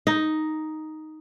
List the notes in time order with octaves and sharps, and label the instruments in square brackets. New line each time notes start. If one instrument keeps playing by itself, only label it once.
[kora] D#4